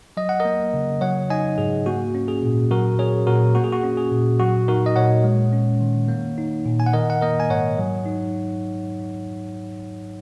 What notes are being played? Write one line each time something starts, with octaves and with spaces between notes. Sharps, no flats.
F#3 D#5
F#5
A#4 D#5
A#3
C#3
F#3 C#5 F#5
D#4 D#5 G#5
G#2 G#4
A#3 F#4
C#4
G#4
A#2
F#3 F#4 A#4
C#4 G#4 C#5
A#2 F#4 A#4
A#3 F#4
G#4
F#4
C#4
G#4
A#2
F#3 F#4
D#4 F#4 A#4
D#5
A#2 C#5 F#5
G#3
C#4
D#3
A#3
D#4
A#2
G#5
F#5
D#3 A#4 D#5
F#5
A#3 A#4 D#5
G#5
G#2 C#5 F#5
F#3
D#4